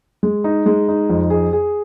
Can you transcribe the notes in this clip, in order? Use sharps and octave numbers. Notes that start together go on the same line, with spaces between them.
G#3
D#4
G#3
D#4
F2
G#4
G#4